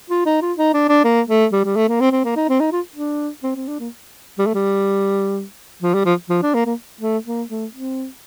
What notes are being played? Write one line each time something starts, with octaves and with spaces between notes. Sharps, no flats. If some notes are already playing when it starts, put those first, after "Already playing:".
F4
D#4
F4
D#4
D4
D4
A#3
A3
G3
G3
A3
A#3
C4
C4
A#3
D#4
C4
D#4
F4
D4
C4
C4
D4
A#3
G3
A3
G3
F3
G3
F3
F3
D4
A#3
A#3
A3
A#3
A3
C4